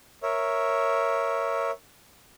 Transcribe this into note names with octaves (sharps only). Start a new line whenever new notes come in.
A#4 C#5 E5